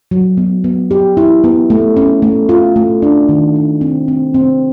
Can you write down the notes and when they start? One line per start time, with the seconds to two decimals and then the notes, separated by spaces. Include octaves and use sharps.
0.11 F#3
0.37 B3
0.64 B3
0.91 G4
1.17 E4
1.44 B3
1.70 A3
1.97 C#4
2.22 A3
2.49 F4
2.76 A3
3.02 D4
3.29 D#3
3.55 D4
3.81 C4
4.08 C4
4.34 C4